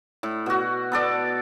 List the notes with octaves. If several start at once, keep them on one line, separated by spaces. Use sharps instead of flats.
A2
B2 F#4
B3 A4 D5